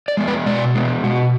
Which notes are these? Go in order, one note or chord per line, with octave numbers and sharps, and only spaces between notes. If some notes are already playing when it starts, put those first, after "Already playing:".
D5
G#3 B3
B4
B2 D5
G#3 B3
B2 F#4